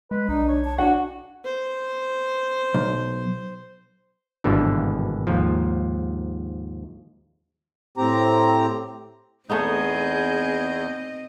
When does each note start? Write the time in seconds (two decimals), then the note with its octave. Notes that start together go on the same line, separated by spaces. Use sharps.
0.11 G#3 B4
0.29 B1 D4 D#4
0.48 C#5
0.64 A5
0.78 D4 F#4 F#5
1.44 C5
2.74 B1
4.44 G#1 G2 B2 D3 E3
5.27 D#2 G#2 F3
7.97 A2 C4 G4 A#5
9.50 E2 A3 B3 C4 D#4 G#4 D#5 G6